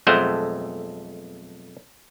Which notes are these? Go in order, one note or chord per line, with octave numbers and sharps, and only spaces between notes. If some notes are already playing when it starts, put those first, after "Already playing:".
B1 F2 G#3 A3 C5 F#5